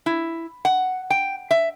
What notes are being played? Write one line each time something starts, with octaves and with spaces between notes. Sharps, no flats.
E4
F#5
G5
E5